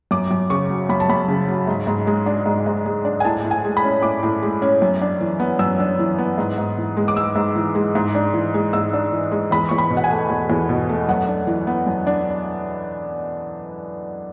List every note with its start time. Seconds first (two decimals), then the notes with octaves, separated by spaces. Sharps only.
0.11 F#2 D6
0.31 F#2
0.50 C#3 C#6
0.70 F#3
0.89 F#2 B5
1.00 A5
1.10 F#2 B5
1.28 C#3
1.48 F#3
1.67 G#2
1.87 G#2
2.07 G#3
2.26 D4
2.46 G#2
2.66 G#2
2.85 G#3
3.05 D4
3.20 G#5
3.25 A2 A5
3.44 A2
3.51 G#5
3.64 G#3
3.77 B5
3.84 C#4
4.02 A2 D6
4.23 A2
4.42 G#3
4.62 C#4
4.82 F#2
5.02 D4
5.21 E3
5.40 B3
5.59 F#2 E6
5.80 D4
5.99 E3
6.18 B3
6.38 G#2
6.58 G#2
6.77 E3
6.97 G#3
7.08 D6
7.17 G#2 E6
7.36 G#2
7.56 E3
7.75 G#3
7.95 G#2
8.15 D4
8.34 E3
8.54 G#3
8.73 G#2 E6
8.93 D4
9.12 E3
9.32 G#3
9.51 E2 B5
9.69 E2 C#6
9.78 B5
9.90 B2
9.97 F#5
10.04 G#5
10.11 A3
10.30 E2
10.50 E2
10.69 B2
10.89 A3
11.09 F#2 F#5
11.28 D4
11.47 E3
11.67 B3
11.87 F#2
12.07 D4